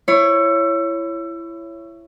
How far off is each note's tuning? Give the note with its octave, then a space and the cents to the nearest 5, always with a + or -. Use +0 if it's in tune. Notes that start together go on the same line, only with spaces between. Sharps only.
E4 +25 C#5 +0